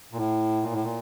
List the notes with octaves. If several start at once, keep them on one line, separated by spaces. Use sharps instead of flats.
A#2
A2
A#2
A2
A#2